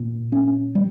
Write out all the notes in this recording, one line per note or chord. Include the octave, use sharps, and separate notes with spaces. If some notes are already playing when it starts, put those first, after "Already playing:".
Already playing: A#2
C#4
G3